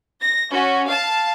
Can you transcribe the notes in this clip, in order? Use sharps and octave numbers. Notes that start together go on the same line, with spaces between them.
A#6
C#4 F#4
F5 A5